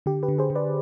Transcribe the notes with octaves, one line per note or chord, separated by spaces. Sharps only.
D3 G4
G4 B4
D3
G#4 C5
D3
B4 D5